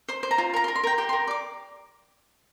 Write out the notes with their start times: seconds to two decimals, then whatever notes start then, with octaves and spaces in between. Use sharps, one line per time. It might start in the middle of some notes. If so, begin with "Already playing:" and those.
0.09 C5 C6
0.23 C5
0.31 A#5
0.38 F4
0.53 A#4 A#5
0.64 C6
0.68 A#4
0.76 C6
0.83 A#4 G5
0.98 G4 G5
1.09 C6
1.13 A#4
1.27 D5 D6